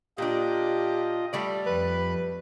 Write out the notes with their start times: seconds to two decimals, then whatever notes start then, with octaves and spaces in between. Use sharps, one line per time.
0.18 A#2 D4 F4 G4 D#5
1.33 G3 A3 D5
1.66 F2 B4